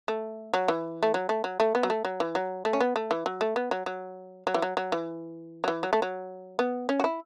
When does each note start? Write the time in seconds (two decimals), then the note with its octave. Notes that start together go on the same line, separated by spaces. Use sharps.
0.08 A3
0.54 F#3
0.68 E3
1.03 A3
1.14 F#3
1.29 A3
1.44 F#3
1.60 A3
1.75 B3
1.83 F#3
1.90 A3
2.05 F#3
2.20 E3
2.35 F#3
2.65 A3
2.73 C#4
2.80 B3
2.96 A3
3.11 E3
3.26 F#3
3.41 A3
3.56 B3
3.71 F#3
3.86 F#3
4.47 F#3
4.54 E3
4.62 F#3
4.77 F#3
4.92 E3
5.64 F#3
5.68 E3
5.83 F#3
5.93 A3
6.02 F#3
6.59 B3
6.89 C#4
7.00 F#4
7.04 E4